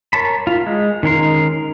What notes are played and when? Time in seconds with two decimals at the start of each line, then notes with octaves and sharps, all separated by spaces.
0.13 A#4 C#5 A5 B5
0.47 F4
0.66 G#3
1.03 D#3 C#4 A#4 C6